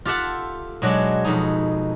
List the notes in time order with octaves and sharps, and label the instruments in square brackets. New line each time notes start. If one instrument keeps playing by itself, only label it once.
[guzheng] F4 G4 A4 E5 F#5 A5
B2 F#3 G#3 D4
F2 B2 D#4